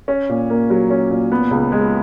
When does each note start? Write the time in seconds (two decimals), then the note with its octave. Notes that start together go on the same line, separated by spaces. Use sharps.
0.08 C#4
0.29 A#2
0.50 A#3
0.70 F#3
0.90 C#4
1.11 A#2
1.32 B3
1.51 C#2
1.72 G#3